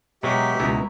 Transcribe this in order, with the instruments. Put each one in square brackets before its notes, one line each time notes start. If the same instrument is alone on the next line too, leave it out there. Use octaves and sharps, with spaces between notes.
[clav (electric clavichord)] B2 F#3 [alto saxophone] G#3 [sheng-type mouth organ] G4 E5 [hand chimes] A#5 C#6
[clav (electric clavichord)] C#2 B2 G#4 [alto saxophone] E4